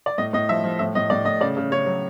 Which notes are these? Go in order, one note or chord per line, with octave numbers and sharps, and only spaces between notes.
D5
A2 D#5
A2 D#5
F3 E5
F3
A2 E5
A2 D#5
A2 D5
A2 D#5
C#3 D5
C#3
C#3 C#5
F#3